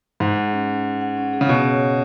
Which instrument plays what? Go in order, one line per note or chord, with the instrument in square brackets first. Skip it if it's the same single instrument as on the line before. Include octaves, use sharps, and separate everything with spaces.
[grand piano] G#2 [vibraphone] F#5
[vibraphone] G#4
C#4
C#4
C#4
F#5
C#4
G#4
[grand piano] C#3
[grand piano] B2 [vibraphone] G#4
[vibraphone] C#5
G#4